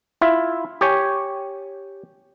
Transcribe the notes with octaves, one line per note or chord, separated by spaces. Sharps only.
E4 F4 E5
G4 C#5 G#5